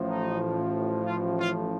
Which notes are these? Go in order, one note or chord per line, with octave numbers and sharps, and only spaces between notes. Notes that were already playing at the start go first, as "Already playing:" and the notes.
Already playing: A1 A2 F3
D#4
F4
F4